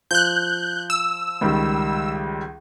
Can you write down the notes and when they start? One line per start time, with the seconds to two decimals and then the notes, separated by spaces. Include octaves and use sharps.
0.11 F3 F#6 G6
0.90 E6
1.41 C#2 D#3 G3